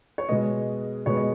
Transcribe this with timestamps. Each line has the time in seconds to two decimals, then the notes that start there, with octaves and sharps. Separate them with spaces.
0.18 C#5
0.29 B2 G#3 B3 D#5
1.06 B2 G#3 B3 C#5
1.17 D#5